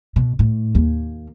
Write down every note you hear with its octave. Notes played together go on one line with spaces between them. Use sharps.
B2
A2
D#2 A#3